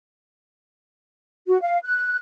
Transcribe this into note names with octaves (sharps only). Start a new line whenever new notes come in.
F#4
F5
F#6